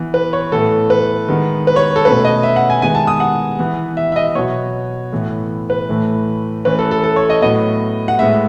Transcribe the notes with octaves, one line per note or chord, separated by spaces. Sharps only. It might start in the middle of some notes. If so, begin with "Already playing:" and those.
Already playing: E3 B3
B4
C#5
A2 E3 B3 A4
B4
D#3 G#3 B3
B4
C#5
A4
B2 A3 C#4 B4
D#5
E5
F#5
G#5
D#3 G#3 B3 G#5
A5
D#6
F#5
E3 B3
E5
E5
D#5
B2 F#3 B3 C#5
A2 E3 B3
B4
A2 E3 A3
E3 A3 C#4 B4
A4
A4
A4
C#5
D#5
A2 F#3 B3 D#5
F#5
A2 G#3 B3 E5